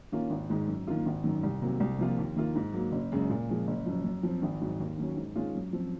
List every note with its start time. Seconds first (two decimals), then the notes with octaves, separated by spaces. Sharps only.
0.12 D#3 A#3 C#4 F4
0.30 G#1
0.50 G#2 D#3 G#3
0.68 F#2
0.87 D#3 A#3 F4
1.06 G#1
1.24 F#2 D#3
1.43 C2
1.61 C3 F#3 A#3
1.80 C2
1.98 C3 F3 A#3 F4
2.18 D#2
2.36 D#3 A#3 F4
2.55 G#2
2.74 F#3 A#3
2.92 F#1
3.12 F#2 C#3 G#3
3.30 A#2
3.49 F3 G#3
3.67 F#1
3.86 F#2 F3
4.04 F#2
4.23 F3 C4
4.42 G#1
4.61 G#2 F#3
4.80 D#2
4.98 D#3 F#3 C#4
5.17 G#2
5.36 D#3 G#3 C#4 F4
5.55 F#2
5.73 F3 C4